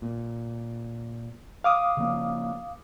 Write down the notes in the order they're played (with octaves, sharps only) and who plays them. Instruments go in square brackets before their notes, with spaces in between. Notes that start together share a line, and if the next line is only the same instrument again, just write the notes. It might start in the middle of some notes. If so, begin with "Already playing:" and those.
[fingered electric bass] A#2
[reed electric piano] F5 D6 D#6
[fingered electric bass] C#3 F3 A#3